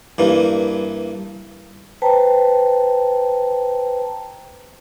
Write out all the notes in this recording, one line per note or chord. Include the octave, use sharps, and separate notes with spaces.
G2 E3 A#3
B4 C5 G5 A5 A#5